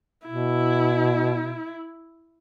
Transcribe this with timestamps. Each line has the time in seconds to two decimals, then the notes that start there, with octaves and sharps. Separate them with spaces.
0.27 B2 E4